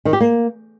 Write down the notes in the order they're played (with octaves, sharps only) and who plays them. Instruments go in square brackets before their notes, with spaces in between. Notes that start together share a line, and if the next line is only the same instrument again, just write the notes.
[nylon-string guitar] D#3
G4
A#3